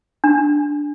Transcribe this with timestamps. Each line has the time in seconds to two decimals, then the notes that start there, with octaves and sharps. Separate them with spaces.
0.24 D4